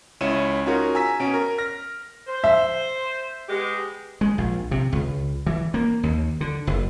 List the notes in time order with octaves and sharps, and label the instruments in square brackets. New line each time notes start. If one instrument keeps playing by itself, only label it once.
[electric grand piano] C#2 C#4 E4 C#5 D#7 E7
C#4 D#4 F4 F#4 G#4 A#4
G#5 A#5 E6 B6
B2 C#4 D7
A#4 A#5
F6 A#6
[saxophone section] C5
[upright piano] E5
[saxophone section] G#3 B3 G4
[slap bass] G#3
A#1
C3
C#2
E3
A#3
D#2
D3
F#1